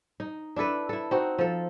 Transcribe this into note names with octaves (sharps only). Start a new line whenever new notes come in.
D#4
D4 E4 A4 B4
E4 A4
C4 D#4 F#4
F3 A4